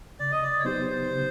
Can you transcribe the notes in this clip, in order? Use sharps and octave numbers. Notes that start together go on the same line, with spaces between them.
C#3 D5
D#5
D5
C#5
F#3 B3 D#4 G4 C5
C#3